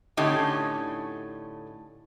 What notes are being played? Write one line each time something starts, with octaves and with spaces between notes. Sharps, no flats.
A2 D3 A3 C#4 D#4 G4